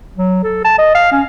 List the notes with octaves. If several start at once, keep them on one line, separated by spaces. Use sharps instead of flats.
F#3
A4
A5
D#5
F5
C#4